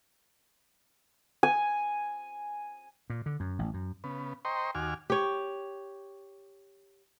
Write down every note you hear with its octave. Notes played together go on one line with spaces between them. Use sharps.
G#5
A#2
D3
F#2
A1
F#2
C#3 B3
C5 D#5 G5 A#5 C6 C#6
D#2 F#4 G#5 D6 F6
G4 C#5